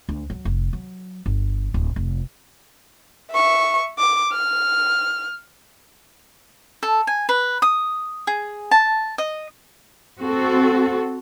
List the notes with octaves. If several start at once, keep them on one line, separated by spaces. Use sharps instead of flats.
D2
F#3
F1
F#3
G1
D1
F1
E5 C#6
D6
F6
A4
G#5
B4
D#6
G#4
A5
D#5
C4 F#4 A4